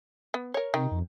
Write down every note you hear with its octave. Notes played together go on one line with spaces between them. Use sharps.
B3
A#4 C#5
C3 D#3
F2